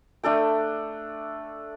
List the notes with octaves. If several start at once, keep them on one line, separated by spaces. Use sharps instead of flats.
A3 D4 A4 G5